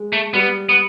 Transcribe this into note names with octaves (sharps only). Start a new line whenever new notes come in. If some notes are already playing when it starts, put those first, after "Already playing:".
Already playing: G#3
A3
G3 B3
B3